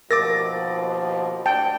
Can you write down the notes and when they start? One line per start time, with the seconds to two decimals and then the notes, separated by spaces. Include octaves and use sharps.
0.11 D#2 B2 F3 A#4 D6 A6 A#6
1.46 D2 A2 D4 G5 A5